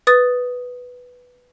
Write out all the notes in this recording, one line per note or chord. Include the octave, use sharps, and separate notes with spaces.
B4 D#6 A6